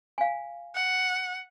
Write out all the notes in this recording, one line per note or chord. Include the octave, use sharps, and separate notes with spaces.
F5 G#5
F#5